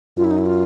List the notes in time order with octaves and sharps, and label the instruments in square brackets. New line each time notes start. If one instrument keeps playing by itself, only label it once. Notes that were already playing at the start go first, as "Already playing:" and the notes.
[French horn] F#2 [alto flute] F4
[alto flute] E4
D#4
E4
F4